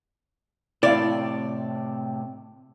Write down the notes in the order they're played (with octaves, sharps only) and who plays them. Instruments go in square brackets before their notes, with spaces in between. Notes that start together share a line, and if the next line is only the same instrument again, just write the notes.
[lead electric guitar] A2 C3 [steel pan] E4 F5 [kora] D5